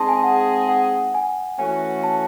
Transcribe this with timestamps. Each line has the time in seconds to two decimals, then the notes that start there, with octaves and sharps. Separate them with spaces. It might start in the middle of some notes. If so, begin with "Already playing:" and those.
Already playing: G#3 C4 D#4 G#4 D#5 A5 C6
0.09 G#5
0.24 F#5
0.69 F#5
1.14 G#5
1.59 E3 A3 C#4 F#4 G#5
2.04 A5